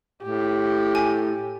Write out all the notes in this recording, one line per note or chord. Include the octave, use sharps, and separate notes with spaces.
A2 G4
G#5